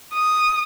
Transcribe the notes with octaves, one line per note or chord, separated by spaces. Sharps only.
D#6